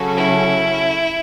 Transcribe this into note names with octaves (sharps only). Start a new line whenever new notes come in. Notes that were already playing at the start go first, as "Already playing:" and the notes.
Already playing: C#3 F#3 C#4 F#4 A4
E4